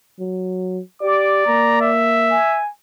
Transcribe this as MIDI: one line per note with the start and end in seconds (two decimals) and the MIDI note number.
0.19 0.80 54
1.02 1.42 67
1.02 1.93 74
1.02 1.36 86
1.47 2.37 58
1.47 1.78 82
1.82 2.61 76
2.31 2.70 80